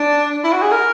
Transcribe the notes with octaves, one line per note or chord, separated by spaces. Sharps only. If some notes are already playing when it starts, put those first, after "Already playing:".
Already playing: D4
E4
F#4
G#4
A#4